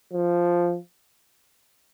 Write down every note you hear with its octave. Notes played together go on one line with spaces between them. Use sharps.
F3